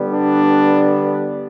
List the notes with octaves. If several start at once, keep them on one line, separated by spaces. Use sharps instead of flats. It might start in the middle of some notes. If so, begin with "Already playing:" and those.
Already playing: D3 G3 B3
D4